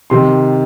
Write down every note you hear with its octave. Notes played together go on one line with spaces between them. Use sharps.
C3 D#3 C6